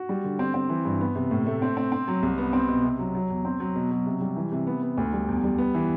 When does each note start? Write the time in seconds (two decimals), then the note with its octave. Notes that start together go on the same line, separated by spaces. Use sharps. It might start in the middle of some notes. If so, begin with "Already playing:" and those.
Already playing: F#4
0.09 G3
0.24 D3
0.39 C4
0.54 C4
0.70 E3
0.85 G2
1.01 B3
1.15 C3
1.31 A2
1.47 A3
1.62 C4
1.77 C4
1.92 C4
2.08 F#3
2.23 C2
2.38 B3
2.53 C4
2.68 B2
2.84 C3
2.99 F#3
3.15 F#3
3.30 E2
3.45 C4
3.60 F#3
3.76 B2
3.91 F#3
4.06 C3
4.21 G3
4.36 E3
4.52 C3
4.67 B3
4.82 B3
4.97 D2
5.13 G3
5.28 E2
5.44 G3
5.58 B3
5.75 E3